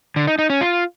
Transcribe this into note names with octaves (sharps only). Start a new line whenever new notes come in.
D3
D#4
D#4
C#4
F4